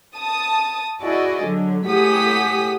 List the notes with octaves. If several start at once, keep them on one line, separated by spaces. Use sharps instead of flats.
A5 D#6
E4 F#4 G#4 D5 D#5
D3 F#3
A2 G4 G#4 F#5 D#6 B6